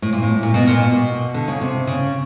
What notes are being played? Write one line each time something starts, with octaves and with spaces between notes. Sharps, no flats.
A2
A#2
A2
A#2
B2
A#2
B2
D3
C#3
C3
C#3